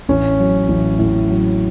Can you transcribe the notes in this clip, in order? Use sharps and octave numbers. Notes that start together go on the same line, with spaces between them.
A1 C#4
F#3
A1
A2
F#3